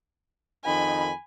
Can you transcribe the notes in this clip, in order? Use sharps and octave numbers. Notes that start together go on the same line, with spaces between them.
F2 D#3 D#4 G#5 B5